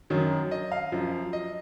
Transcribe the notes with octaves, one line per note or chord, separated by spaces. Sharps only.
F#2 D#3 F#3 C#5
D#5
F5
F#2 F3
D#5